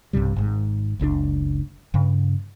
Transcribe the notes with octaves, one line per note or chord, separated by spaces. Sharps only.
B1 G2 C3 G3
G#1 G#2
F#1 C#2 B2 D4
G2 C#3